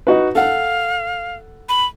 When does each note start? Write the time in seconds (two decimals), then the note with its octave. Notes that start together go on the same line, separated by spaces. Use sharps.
0.07 D#4 F#4 B4
0.35 A4 F5 F#5
1.69 B5